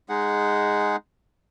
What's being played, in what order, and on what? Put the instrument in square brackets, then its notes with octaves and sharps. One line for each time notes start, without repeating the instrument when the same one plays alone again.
[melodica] G#3 D#4 G#4 F#5